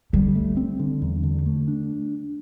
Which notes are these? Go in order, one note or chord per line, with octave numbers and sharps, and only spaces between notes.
D3 G3
A3
C4
D3
E2
D3
A3
D4